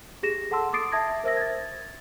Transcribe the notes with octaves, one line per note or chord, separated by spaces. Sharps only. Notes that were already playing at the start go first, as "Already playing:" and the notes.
G4 G#4 A#6 E7
A4 F#5 A5 C6 E6
D6 D#6 A6 C7 D7
E5 A5 D#6 G#6 A#6
A#4 C5 E5 E6 A#6
G#6 A6